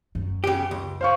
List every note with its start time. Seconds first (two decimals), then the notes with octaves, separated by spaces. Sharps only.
0.15 F#2
0.44 C#3 G4
0.71 C#2
1.01 C5 F5 C#6